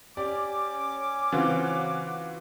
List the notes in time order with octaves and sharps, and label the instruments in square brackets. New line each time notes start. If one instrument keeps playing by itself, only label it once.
[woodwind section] C#4 D6 [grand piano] G4 D5
[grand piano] C#3 C4 [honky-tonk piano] E3 F4 F#4